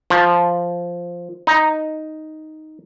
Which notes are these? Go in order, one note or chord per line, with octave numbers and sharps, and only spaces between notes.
F3
D#4